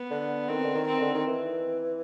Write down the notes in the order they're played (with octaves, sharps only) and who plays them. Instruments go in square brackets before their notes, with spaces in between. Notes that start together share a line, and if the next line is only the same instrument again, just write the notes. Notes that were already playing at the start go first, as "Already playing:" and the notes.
Already playing: [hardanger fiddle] B3
[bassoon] D3
[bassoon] D#3 [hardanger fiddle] C4
[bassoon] D3
D#3
[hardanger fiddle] C4
[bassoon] D3
D#3
E3